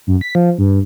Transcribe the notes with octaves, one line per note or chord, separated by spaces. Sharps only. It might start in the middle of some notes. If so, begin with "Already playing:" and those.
F#2
B6
F3
G2